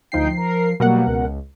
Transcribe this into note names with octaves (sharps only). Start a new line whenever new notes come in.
D2 F3 D#4 G5 C7
A#4
B2 F#3 G3 A#3 A#4 F#5
C#2